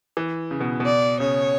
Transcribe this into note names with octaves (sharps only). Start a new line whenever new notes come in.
E3
C#3
B2
B2
D5
C#3 C#5